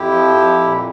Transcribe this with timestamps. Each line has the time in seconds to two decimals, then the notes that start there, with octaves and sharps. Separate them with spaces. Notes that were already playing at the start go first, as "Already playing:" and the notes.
Already playing: F2 E4 G4
0.11 F3
0.36 F2
0.61 A#2